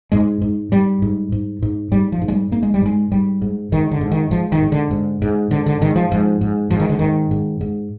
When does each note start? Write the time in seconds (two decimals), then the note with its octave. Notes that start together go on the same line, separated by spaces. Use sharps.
0.12 G#2 G#3
0.42 G#2
0.72 G#2 G3
1.02 G#2
1.32 G#2
1.62 G#2
1.92 G#2 G3
2.12 F3
2.21 G#2
2.28 G#3
2.32 G3
2.51 G#2 A#3
2.63 G#3
2.74 G3
2.81 G#2 G#3
3.12 G#2 G3
3.42 G#2
3.72 G#2 D#3
3.91 D3
4.01 G#2
4.11 D#3
4.31 G#2 F3
4.52 D#3
4.62 G#2
4.72 D3
4.91 G#2
5.22 G#2
5.51 G#2 D3
5.66 D3
5.81 G#2 D#3
5.96 F3
6.11 G#2 F3
6.41 G#2
6.71 G#2 F3
6.80 D#3
6.89 D3
6.99 G#2 D#3
7.31 G#2
7.61 G#2